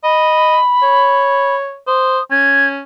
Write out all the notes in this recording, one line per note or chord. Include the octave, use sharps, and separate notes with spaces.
D#5 B5
C#5
C5 D#6
C#4 G#6